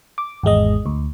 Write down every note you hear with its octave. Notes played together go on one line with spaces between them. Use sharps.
D6
G#1 E2 G#3 D#5
D2